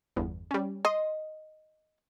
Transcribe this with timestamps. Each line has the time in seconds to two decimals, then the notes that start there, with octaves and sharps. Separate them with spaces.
0.16 G1 E2
0.51 G3 C#4
0.85 D#5 C6 D#6